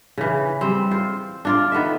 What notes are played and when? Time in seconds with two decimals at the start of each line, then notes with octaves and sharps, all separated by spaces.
0.18 C#3 E3
0.61 G3 C4
0.91 F4 C5
1.45 D4 F4 D5
1.72 D#3 B3 A4 E5